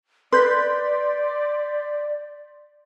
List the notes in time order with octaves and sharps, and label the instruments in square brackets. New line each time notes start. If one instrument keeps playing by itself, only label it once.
[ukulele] B4 [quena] D5 [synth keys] C6 G6 B6